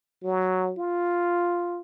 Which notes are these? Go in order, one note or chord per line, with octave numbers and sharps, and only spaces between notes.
F#3
F4